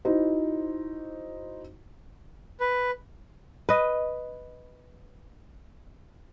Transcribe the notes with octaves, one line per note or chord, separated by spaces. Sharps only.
D#4 E4 F#4 C5
B4
B4 D#5